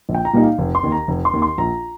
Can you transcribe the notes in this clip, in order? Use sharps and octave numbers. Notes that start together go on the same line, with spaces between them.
A#1
G5
A#5
A#2 G3 A#3 D#4
F5
F1
C6
D#2 D#3
A#5
F1
C6
D#2 D#3
C6
A#1 A#5